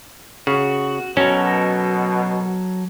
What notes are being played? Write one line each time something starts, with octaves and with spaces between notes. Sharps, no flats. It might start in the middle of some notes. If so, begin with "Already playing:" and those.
C#3 F#4
B2 F#3 C#4 A4 A#4